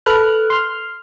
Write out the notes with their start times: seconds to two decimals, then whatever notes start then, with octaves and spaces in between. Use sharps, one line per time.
0.06 A4 B4 F6 F#6
0.50 C6 F6